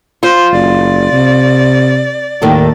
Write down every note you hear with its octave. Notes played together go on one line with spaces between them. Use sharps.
F4 C5
F#1 D5
C3
D#2 A2 D#3 A4